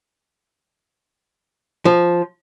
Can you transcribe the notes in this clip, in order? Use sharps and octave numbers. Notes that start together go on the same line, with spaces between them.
F3